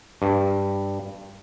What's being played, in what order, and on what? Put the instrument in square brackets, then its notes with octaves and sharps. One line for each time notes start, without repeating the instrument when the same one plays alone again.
[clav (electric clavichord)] G2